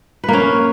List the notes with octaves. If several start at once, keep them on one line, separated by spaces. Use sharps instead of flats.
A#3 C#4 B4